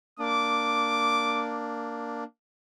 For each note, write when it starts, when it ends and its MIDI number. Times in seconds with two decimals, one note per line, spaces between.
0.19 2.24 58
0.19 2.24 62
0.19 1.67 86